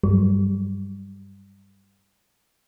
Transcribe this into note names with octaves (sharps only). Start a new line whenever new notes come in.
G2 F#3 G3